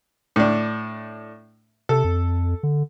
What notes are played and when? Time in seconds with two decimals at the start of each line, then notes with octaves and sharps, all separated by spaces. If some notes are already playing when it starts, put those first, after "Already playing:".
0.36 A2 D4
1.89 C3 A4
2.04 F2
2.63 D3